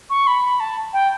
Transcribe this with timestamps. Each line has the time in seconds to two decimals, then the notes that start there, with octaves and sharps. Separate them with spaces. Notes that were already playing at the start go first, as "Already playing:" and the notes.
0.10 C#6
0.27 B5
0.60 A5
0.93 G5